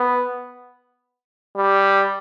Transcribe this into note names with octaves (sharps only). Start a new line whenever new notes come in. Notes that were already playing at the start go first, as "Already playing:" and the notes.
Already playing: B3
G3